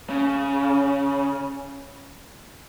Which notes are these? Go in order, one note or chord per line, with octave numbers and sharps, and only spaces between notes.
C#3